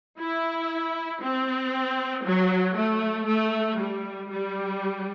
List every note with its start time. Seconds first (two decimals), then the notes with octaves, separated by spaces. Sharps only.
0.18 E4
1.21 C4
2.24 F#3
2.76 A3
3.27 A3
3.78 G3
4.29 G3